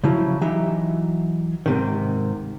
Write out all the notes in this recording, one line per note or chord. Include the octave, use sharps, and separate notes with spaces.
C#3 F3 F#3 E4
E3 F#3 D#4 G4 E5
G#2 C3 D#3